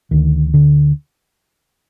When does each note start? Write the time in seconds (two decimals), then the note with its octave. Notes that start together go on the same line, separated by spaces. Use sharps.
0.11 D2 D#3
0.54 D3